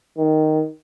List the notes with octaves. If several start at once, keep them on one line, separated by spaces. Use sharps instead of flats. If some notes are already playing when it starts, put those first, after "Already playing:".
D#3